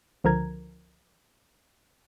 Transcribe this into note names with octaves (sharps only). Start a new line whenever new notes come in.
C#2 D3 F3 A#4 A#5 G#6